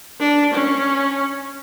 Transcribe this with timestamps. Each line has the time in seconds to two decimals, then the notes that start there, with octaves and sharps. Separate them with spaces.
0.20 D4
0.53 C#4